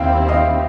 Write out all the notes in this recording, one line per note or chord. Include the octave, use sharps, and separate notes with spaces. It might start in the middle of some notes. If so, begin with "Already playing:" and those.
Already playing: D#2 D#3 G3 C4 E4 F5 G5
D#5 F5